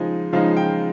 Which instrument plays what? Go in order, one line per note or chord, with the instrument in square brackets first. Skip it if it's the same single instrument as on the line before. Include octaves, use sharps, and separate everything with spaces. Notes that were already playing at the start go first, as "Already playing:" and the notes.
Already playing: [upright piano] C#3 F3 G#3 D#4
C#3 F3 G#3 D#4 F5
G5